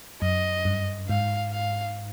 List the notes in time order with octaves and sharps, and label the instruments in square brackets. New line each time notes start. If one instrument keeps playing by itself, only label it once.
[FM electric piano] F#2 [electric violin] D#5
[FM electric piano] G2
[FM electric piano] G#2 [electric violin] F5
[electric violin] F5